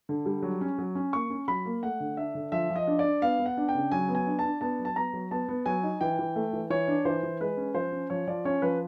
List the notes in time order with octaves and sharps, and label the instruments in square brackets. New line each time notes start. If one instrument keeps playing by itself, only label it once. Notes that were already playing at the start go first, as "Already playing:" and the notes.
[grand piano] D3
G3
F#3
C#4
F#3
C#4
A#3 C#6
C#4
F#3 B5
A#3
A3 F#5
D3
D4 E5
D3
F3 E5
F3
D#5
D4
D4 D5
B3 F5
B3
F#5
D4
G5
C#3
F#3 G#5
B3
G#5
D4
A5
D4
B3 A5
F#3
A5
B3 A#5
F#3
B3 A5
B3
F#3 G#5
D#4
E3 G5
E3
A3
E3
E3 C#5
D4
E3 C5
E3
G#3 B4
C#4
F3 C5
C#4
F3 C#5
F3 D5
C#4 C#5
F3 B4